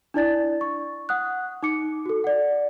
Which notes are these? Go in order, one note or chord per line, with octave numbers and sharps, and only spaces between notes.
D4 E4 D5 A6
C#6
F#5 D#6 F#6
D#4 D6 C#7
F#4 A4
D5 F#5